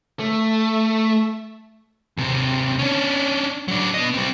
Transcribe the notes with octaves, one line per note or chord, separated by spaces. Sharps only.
A3
D#2 C3
C#4 D4
F#3 D4
B3 D#5
G3 C4